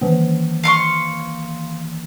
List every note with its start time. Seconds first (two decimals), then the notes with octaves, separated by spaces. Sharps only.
0.01 D#3 E3 A#3
0.64 F5 C6 C#6